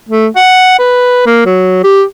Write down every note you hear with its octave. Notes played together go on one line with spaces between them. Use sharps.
A3
F#5
B4
A#3
F#3
G4